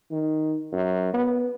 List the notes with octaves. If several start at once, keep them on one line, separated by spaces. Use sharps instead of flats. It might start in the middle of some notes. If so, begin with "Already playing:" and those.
D#3
F#2
B3